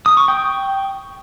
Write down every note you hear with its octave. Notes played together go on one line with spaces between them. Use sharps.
D#6
C#6
G5